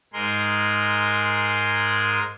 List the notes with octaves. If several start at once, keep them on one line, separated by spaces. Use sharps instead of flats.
G#2 G#3 G#4 A#4 C6